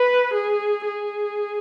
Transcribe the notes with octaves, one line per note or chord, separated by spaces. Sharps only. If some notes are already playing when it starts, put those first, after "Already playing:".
Already playing: B4
G#4
G#4